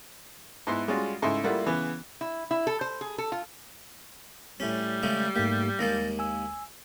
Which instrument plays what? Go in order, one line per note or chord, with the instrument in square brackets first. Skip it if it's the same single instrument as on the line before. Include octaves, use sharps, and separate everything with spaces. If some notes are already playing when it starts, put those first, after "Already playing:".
[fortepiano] G#2 B3 E4 C6
G3 G#3 C#4 F4 F#4
G#2 C#3 A3 E4 E5 C6
G3 A3 A#3 E4 F4 F#5
C#3 E3 B3
[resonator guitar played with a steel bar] E4
E4
A4
C5
G#4
A4
F4
[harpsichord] A2 C#4 [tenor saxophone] G3
[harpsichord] C#3 G#3 A3
[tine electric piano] G#2 A3 A#3 [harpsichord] G4
[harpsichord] D#2 G#3 A#3 [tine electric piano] A6 A#6
[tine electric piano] G#5 E6